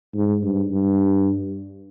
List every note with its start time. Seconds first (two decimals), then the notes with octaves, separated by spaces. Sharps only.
0.14 G#2
0.42 G2
0.71 G2